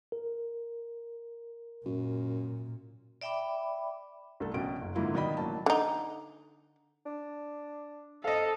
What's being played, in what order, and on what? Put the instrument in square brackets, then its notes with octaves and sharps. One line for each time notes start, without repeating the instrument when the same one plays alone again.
[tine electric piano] A#4
[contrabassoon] F#2 [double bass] A#2
[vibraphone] D5 E5 G5 B5 D6
[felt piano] C2 A3 A4
A#1 B2 C#4 D7
F#1
G#2 D3 F#3 A#3 E4 F4
B2 D#3 D5 D#5 B5
A1 F#3 A#3 A5
[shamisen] D3 D#4
[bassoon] D4
[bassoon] C4 [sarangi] A4 [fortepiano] D#5 F5